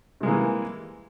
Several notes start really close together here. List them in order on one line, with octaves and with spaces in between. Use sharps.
C3 G#3 A#3 E3